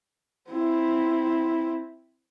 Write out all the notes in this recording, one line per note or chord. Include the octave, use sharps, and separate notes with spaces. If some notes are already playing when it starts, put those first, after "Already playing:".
C4 E4